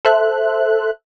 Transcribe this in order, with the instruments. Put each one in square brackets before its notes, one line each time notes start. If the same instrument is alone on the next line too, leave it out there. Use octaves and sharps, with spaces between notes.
[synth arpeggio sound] A4 C5 E5 F#6